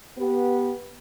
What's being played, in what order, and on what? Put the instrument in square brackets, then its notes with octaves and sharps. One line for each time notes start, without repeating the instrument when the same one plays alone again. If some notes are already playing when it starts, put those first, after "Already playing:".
[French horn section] B3 G4